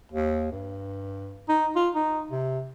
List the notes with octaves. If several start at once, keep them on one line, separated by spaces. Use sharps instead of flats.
D#2
G2
D#4
F4
D#4
C3